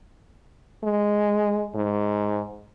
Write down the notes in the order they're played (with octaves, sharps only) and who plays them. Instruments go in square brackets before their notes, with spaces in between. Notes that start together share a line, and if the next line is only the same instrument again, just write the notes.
[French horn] G#3
G#2